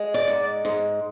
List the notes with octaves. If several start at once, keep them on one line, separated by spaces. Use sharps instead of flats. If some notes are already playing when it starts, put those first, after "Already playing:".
Already playing: G#3
D5
G#2
G#2